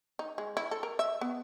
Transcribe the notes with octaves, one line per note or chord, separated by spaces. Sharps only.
D#4
G#3
E4
A4
A#4
E5
B3